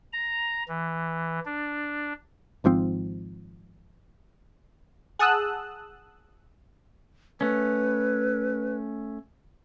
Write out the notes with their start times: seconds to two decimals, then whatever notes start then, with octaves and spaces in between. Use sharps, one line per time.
0.13 A#5
0.68 E3
1.45 D4
2.64 G#1 G#2 F3 C4
5.19 G#4 F#5 A5 D#6 E6 F#6
7.41 A3 C#4 B4